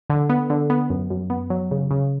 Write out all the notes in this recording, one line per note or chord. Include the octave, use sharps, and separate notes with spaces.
D3
B3
D3
B3
F#2
F#2
B3
F#3
C#3
C#3